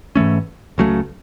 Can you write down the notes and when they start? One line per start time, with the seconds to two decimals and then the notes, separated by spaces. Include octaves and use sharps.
0.16 G#2 E3 A3 C#4
0.78 C#2 C#3 F#3 A3